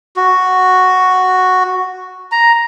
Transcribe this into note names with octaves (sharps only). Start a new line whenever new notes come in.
F#4
A#5